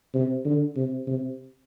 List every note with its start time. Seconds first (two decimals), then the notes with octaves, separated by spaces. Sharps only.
0.14 C3
0.45 D3
0.76 C3
1.07 C3